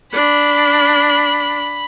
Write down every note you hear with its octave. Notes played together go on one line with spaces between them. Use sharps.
D4 B5